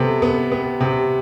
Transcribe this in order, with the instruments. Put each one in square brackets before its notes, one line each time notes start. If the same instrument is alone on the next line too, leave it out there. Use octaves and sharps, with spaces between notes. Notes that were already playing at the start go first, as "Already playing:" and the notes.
Already playing: [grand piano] C3 B3 [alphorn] A4
[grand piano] B3
[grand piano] B3 [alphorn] G4
[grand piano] C3